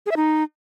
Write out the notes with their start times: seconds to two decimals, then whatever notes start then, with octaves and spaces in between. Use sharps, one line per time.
0.06 G#4
0.11 E5
0.16 D#4